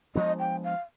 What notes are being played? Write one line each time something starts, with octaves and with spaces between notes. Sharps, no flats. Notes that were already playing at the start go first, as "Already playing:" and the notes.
F3 G#3 B3 D4 D#5
G5
F5